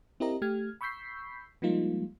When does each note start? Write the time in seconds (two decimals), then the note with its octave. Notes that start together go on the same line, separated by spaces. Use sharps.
0.20 C4 E4 G4 A#4 D#5 A#5
0.42 A3 G4 F6 G#6
0.81 B5 C#6 E6 G6 B6 C7
1.62 F3 G3 G#3 A#3 D#4 F4